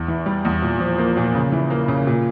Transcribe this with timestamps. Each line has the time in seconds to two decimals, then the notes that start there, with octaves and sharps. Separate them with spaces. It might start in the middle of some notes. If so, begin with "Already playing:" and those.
Already playing: E2
0.08 E3
0.26 G3
0.45 E2
0.62 A#2
0.80 F3
0.98 A#3
1.17 A#2
1.34 C#3
1.52 E3
1.70 A#3
1.88 C#3
2.07 A#2